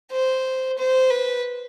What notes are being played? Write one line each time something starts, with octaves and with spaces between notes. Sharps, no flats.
C5
C5
B4